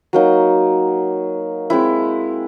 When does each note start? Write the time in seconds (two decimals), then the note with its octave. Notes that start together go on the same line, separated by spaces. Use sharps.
0.13 F#3 A#3 D#4
1.70 G#3 C4 E4